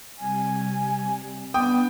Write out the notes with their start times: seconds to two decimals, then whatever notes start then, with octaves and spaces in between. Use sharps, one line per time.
0.19 C3 G3 G#5
1.54 B3 D4 G5 D#6